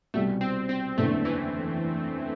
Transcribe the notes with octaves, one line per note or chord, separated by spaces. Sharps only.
C2 B2 G3 A3
C4
C4
F#1 E2 D3 A3
E3